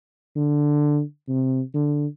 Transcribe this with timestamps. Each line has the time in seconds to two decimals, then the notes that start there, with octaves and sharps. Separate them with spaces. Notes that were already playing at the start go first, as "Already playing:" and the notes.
0.36 D3
1.29 C3
1.74 D3